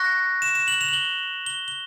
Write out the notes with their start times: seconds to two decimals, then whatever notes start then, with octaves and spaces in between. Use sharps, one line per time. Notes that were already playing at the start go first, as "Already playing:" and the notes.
Already playing: C#6 F#6 A#6
0.42 E7
0.55 E7
0.68 F#7
0.81 F7
0.89 F#7
0.94 G7
1.46 G7
1.68 G7